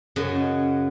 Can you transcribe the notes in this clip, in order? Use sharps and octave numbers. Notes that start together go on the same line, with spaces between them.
F#2 C#3 B4 D#5